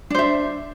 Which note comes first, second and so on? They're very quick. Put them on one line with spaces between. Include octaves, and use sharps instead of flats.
D4 C5 E5